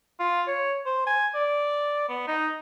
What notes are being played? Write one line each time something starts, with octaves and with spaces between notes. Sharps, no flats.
F4
C#5
C5
G#5
D5
B3
D#4